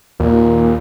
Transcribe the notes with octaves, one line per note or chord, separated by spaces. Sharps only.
D#2 A#2